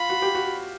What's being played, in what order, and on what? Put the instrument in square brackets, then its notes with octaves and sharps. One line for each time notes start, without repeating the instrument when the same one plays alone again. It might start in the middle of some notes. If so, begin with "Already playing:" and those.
Already playing: [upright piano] F4 [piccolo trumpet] B5
[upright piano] F#4
G4
F#4